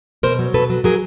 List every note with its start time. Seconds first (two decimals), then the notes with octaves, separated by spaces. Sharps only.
0.23 B2 A#4 C5
0.39 F#3
0.54 B2 A4 B4
0.70 F#3
0.84 F#3 G#4 A#4